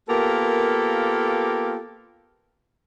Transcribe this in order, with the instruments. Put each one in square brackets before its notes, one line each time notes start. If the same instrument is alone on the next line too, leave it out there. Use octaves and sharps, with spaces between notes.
[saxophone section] A#3 B3 F4 G4 A4 A#4